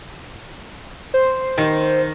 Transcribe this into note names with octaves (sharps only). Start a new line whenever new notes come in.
C5
D#3